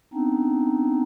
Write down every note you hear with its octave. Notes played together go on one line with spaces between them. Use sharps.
B3 C4 D4 D#4